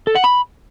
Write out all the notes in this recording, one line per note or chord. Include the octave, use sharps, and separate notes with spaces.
A4
F#5
B5